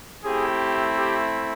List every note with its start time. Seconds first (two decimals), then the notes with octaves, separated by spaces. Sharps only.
0.23 A3 C4 E4 G4 G#4
0.97 G4